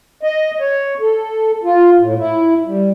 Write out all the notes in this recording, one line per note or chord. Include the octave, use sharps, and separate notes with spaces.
D#5
C#5
A4
F4
A2
E4
G3